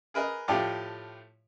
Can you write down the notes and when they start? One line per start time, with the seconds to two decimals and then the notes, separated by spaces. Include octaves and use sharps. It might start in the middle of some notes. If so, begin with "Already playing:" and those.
0.14 G#4 A#4 B4 D#5
0.48 A2 F3 A3 G4 D5 F5